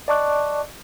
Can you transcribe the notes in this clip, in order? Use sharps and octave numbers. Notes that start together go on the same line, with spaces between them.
D5 D#5 A5 C#6 D6 F#6